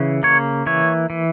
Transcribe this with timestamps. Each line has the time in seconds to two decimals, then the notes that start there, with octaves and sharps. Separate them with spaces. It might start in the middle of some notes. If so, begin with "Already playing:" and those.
Already playing: C#3 E3
0.23 A#3 C#5
0.66 E3 C#5
1.10 E3